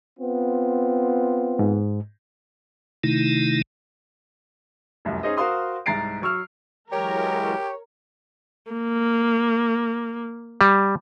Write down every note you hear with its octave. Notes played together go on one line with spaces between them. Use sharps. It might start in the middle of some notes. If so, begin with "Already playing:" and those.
B3 C4 F4
G#2
C3 D#3 A3 D#4 E4
F1 C2 F#2
C#4 D#4 G#4 C5 D#5
F#4 A#4 C5 F5 C6 D#6
C2 G#2 A#5 A6 C7 D7
F#3 C#6 E6 F6
E3 F#3 G#3 G4 A#4 C#5
A#3
G3